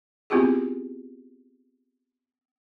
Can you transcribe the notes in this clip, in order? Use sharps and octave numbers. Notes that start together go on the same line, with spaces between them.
B3 C4 E4 F4 G4 G#4